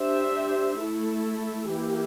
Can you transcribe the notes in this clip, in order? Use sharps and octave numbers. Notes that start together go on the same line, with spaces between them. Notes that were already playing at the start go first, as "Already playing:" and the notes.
Already playing: D4 G4 C5 E5
A3 E4 A4
E3 A#3 E4 G4